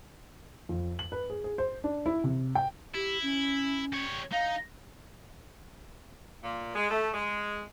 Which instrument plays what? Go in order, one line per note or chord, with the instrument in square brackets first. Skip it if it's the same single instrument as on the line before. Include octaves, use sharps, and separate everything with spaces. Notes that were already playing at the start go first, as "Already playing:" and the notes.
[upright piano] F2
F#7
B4
G#4
G#4
C5
D4
E4
C3
G5
[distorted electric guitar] E4 [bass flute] G4
[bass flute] C#4
[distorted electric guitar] G3 C#5
[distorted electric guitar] D#4 [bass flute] F5
[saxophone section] A#2
G#3
A3
G#3